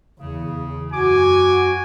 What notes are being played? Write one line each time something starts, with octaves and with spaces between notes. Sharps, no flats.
E2 C#3
F#2 F#4 G#5 D6